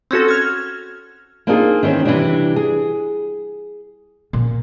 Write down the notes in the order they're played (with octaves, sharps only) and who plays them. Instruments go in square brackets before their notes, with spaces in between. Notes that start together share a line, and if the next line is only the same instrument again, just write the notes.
[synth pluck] C4 C#4 F#4 A4
F6 G#6
[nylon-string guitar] A#3 C4 D4 D#4 F4 G#4
D#3 E3 C4 C#4
C3 E3 F3 G3 G#3 D4
G#4
[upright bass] A#2